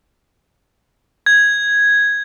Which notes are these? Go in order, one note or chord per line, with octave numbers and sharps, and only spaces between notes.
G#6